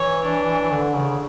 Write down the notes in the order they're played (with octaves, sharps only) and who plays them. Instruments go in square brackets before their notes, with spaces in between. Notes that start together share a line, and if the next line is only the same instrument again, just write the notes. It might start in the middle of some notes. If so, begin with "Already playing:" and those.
Already playing: [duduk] E3 [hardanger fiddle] C#5
[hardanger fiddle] D4
[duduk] D3
C#3